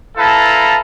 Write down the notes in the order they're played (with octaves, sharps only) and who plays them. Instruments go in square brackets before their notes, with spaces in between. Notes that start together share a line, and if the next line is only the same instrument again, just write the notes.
[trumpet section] E4 A4 B4 F5 A5 A#5